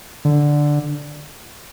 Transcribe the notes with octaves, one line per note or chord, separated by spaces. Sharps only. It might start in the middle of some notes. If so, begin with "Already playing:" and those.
D3